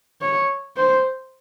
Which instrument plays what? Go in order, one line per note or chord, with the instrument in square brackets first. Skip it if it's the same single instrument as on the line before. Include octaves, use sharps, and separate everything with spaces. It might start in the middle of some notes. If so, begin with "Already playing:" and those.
[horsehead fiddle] C#5
C5